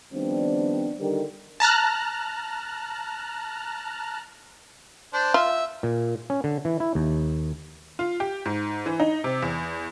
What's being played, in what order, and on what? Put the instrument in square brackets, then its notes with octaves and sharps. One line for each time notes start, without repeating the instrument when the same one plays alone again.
[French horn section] D#3 F3 G3 B3 C4 D4
D3 D#3 G3 D4 G4 A#4
[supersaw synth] A5 A#5 F6 F#6
[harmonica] D4 C5
[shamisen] F4 [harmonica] E5
[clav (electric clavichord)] A#2
C#4
D3
E3
E4
D#2
[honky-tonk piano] F4
G4
G#2
E3
D#4
C3
E2